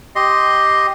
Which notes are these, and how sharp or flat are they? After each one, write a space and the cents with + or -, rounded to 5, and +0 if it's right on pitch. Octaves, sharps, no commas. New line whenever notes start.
G4 +0 D#5 +0 C6 +0